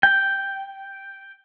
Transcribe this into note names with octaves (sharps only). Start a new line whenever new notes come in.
G5